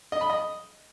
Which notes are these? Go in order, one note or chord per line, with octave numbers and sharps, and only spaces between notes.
D#5
B5
D#5